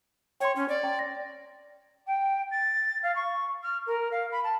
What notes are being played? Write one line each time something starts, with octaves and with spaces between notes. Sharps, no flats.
C#5 G5 C6
C#4
D5
G5 A#5
A#6
G5
A6
F5
C#6
F6
A#4
F5
B5
A5